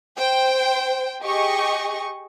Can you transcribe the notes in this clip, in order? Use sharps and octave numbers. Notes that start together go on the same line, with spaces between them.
C5 G5
G4 G#4 D#5 C#6